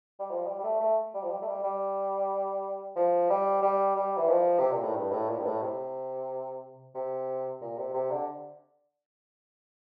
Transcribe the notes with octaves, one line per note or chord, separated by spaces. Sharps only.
G3
F3
G3
G3
A3
A3
G3
F3
G3
A3
G3
G3
F3
G3
G3
G3
E3
F3
C3
A#2
A2
G2
A2
A#2
G2
A2
C3
C3
A#2
C3
C3
D3